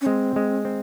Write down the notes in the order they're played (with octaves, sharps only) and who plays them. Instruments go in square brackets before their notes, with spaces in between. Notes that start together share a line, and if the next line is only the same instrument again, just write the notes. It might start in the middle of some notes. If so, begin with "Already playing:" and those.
[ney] C#4
[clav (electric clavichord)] G#3 [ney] C4
[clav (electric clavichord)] G#3
C4